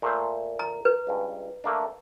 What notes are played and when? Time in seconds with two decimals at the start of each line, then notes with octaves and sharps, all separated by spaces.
0.02 A#2 A3 C5
0.59 A#5
0.85 B4
1.07 C#2 G2
1.64 A3 A#3 D4